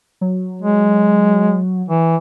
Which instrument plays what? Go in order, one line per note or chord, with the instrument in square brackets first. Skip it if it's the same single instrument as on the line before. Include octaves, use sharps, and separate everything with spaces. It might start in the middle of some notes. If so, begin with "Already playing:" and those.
[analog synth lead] F#3
[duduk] G#3
E3